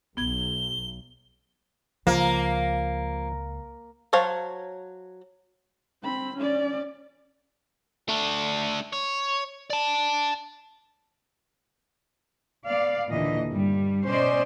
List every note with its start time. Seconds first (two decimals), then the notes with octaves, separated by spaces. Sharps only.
0.17 B1 B3 G#6 G7
2.07 C#2 F3 A#3
4.13 F#3 C5 C#5 F5 A5
6.03 C4 B5
6.36 C#4 D5
8.08 A3 D4
8.93 C#5
9.70 D5 A5
12.67 B3 D5 F5
13.11 D#2 A#2 D3 E3 D#5
13.51 G2 G3
14.07 B2 C#4 C5 D5 D#5